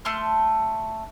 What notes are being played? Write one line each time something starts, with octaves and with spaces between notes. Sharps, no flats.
A3 A5 C6 F6